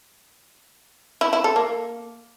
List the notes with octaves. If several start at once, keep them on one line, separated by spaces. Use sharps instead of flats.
E4
E4
A4
A#3